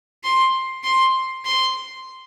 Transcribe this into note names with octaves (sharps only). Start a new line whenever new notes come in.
C6
C6
C6